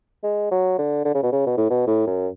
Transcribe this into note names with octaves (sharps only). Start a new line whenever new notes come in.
G#3
F#3
D3
D3
C#3
B2
C#3
B2
A2
B2
A2
F#2